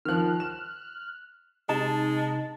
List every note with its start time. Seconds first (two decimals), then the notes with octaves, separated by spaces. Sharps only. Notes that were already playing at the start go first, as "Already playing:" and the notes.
0.05 D#3 F3 F6 F#6
0.40 E7
1.69 C3 G#3 D#4 A5